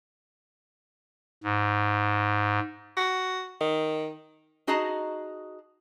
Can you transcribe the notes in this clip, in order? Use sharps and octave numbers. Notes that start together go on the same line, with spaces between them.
G#2
F#4
D#3
D#4 F#4 G#4 D#5 A5 A#5